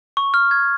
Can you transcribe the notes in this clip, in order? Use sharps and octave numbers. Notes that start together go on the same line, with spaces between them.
C#6
F6
G#6